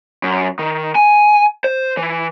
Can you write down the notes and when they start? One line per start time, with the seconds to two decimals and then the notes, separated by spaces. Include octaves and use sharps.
0.23 F#2
0.59 D#3
0.95 G#5
1.64 C5
1.97 E3